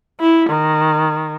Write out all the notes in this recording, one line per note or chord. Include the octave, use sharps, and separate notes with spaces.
E4
D#3